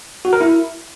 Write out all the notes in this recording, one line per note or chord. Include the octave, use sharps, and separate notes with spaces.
F#4
A#4
E4